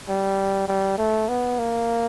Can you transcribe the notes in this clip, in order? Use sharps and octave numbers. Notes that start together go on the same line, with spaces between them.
G3
G3
A3
B3
A#3